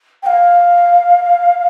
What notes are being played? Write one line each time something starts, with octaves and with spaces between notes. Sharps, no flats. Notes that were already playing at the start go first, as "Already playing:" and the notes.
G5
F5